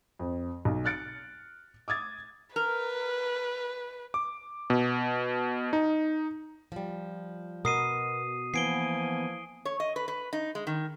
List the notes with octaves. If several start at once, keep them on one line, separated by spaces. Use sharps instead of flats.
F2
B1
F6 F#6 A6 C#7 D7
D6 D#6 G#6 A6
A#4 B4
D6
B2
D#4
F3 G3
B2 B3 A#4 D#6 C7 D#7
E3 F3 A#3 B3 G#5 C7 D7 G7
C#5
D#5
B4
B4
D#4
G#3
D#3